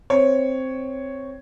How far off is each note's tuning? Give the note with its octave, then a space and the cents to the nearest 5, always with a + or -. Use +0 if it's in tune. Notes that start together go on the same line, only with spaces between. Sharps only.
C4 +0 C#5 +0